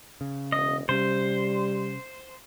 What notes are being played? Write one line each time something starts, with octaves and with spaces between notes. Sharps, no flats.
C#3
E1 D#5
C3 G3 C#4 C5